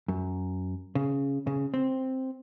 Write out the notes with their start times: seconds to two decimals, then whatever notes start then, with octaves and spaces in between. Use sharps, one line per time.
0.08 F#2
0.95 C#3
1.47 C#3
1.74 C4